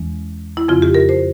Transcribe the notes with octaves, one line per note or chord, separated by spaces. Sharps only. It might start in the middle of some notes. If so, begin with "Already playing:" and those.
Already playing: E2 E3 G#3 C#4
E4
F2 C#3 F3 C4 F4
G4
A#4
C5